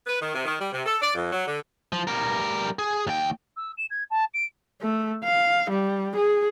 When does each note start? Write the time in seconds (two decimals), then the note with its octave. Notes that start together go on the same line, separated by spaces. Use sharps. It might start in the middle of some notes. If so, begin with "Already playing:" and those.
0.06 B4
0.20 D#3
0.33 C3
0.45 D#3
0.59 G3
0.72 C3
0.86 A4
1.01 D5
1.14 F2
1.32 F#3
1.47 D3
1.92 F3
2.07 G3 A#4
2.79 G#4
3.07 D#2 G5
3.57 E6
3.78 E7
3.90 G#6
4.10 A5
4.34 D7
4.82 A3
5.24 F5
5.70 G3
6.16 G#4